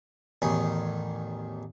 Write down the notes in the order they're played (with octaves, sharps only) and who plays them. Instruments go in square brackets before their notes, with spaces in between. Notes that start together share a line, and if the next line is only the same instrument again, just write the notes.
[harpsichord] A1 E2 D#3 G#4 C#5